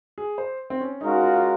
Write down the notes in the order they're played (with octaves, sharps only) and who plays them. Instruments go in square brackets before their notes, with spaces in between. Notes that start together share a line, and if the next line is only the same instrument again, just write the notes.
[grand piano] G#4
C5
C4
C#4
[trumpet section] G#3 C#4 F#4 A#4 F5 [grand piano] D#4
[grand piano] F4
F4